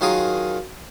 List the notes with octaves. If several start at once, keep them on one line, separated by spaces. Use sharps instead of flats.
D#3 F#3 F4 G#4 A#4 D#6